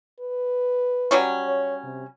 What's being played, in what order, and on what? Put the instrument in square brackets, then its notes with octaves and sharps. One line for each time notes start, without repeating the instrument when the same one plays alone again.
[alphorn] B4
[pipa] F#3 G3 C#4
[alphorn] C#5
C3